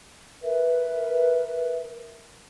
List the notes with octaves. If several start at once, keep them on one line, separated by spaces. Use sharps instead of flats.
A#4 B4 E5